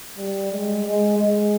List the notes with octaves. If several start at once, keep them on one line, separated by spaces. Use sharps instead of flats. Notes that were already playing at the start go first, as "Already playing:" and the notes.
G3
G#3
G#3
G#3